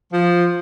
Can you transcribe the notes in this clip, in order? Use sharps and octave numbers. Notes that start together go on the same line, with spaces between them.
F3